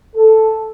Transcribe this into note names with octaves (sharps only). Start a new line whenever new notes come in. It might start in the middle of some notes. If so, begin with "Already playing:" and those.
A4